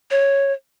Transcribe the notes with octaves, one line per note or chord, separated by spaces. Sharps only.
C#5